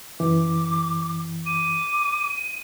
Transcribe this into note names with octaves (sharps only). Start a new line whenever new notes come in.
F#2 E3 D6
D6 D#7